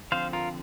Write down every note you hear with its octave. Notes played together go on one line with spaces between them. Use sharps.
D3 F3 C4 C5 F5
F4 A#4